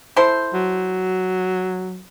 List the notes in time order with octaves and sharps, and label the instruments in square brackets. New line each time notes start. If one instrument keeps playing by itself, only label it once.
[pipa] E4 A4 C5
[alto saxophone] F#3